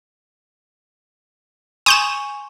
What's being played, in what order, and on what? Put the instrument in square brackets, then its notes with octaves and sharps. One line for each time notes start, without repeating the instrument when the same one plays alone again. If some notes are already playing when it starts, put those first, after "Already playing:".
[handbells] G#5 C6 C#6 [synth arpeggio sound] D#6 G6 E7